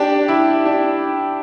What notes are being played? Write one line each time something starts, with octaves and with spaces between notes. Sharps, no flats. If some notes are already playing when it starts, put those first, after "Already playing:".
Already playing: D4 G4
E4
D4